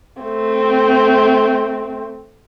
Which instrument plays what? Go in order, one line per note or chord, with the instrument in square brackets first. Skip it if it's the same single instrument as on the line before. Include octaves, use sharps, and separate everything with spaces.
[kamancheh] A3 C4